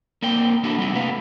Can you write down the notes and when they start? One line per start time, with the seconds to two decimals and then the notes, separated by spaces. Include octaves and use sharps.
0.22 A#3 C4 A#4 D5 G5
0.64 A#3 D4 E4 F#4 A4
0.78 G3 C4 D#4 F#4
0.95 C3 A3 B4 F5